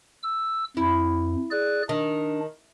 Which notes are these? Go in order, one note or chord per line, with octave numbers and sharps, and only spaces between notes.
E6
F2 E4
G#4 D5 F#6
D#3 D4